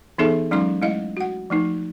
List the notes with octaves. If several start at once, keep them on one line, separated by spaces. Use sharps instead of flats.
E3 B3 D#4 G#4 A4 E5
F#3 G#3 C#4 D#4 C6 D6
G#3 A3 E4 D#5 F5
F#4 F#5
F3 A3 D#4